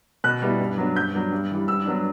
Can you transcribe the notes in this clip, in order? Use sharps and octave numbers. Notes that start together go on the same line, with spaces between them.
B2 F#6
G3 B3 E4
G2
F#3 B3 D4
G2 G6
F#3 B3 D4
G2
E3 G3
G2 E6
F#3 B3 D4